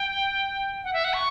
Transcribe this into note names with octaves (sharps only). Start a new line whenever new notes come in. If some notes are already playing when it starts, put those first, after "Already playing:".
Already playing: G5
F#5
E5
F#5
C#6